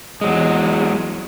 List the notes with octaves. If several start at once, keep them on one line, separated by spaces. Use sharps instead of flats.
E2 F#3 G#3